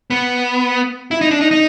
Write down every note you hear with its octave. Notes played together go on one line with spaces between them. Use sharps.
B3
E4
D#4
D4
D#4
D#4